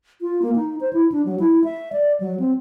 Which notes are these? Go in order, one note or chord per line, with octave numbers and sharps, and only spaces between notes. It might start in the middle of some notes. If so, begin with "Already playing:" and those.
F4
A#3
D#4
C5
E4
D4
F#3
E4
E5
D5
F#3
C4